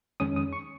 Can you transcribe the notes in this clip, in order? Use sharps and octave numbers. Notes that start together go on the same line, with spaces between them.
F2 D#3 G#3 C#4 D#6
D#6
C#6